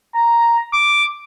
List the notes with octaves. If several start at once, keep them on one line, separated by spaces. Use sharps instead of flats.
A#5
D6